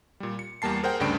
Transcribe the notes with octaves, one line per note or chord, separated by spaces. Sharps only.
A#2 G3
C#7
E2 G3 A#3 A5 C7
G#4 A#4 C5 F#5 G5
D2 G2 C#3 D4 G5 D7